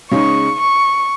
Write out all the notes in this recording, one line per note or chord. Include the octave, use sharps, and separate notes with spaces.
C#3 G#3 D#4 C#6
C#6